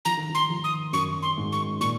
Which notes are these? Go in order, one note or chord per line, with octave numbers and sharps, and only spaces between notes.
F3 A#5
D#3
F3
C6
F3
D#6
F#2 C#6
C6
G#2
C#6
A#2 C#6